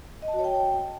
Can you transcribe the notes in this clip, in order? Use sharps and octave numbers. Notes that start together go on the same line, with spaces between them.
D#5
A5
F#4
C#5
G5